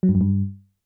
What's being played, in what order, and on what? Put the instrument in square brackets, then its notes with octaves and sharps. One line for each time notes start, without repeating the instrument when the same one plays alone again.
[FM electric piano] F#3
G2
F#2
G2